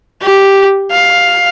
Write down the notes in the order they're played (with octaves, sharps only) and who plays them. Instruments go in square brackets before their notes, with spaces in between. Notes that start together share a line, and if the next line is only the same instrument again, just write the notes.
[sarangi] G4
F5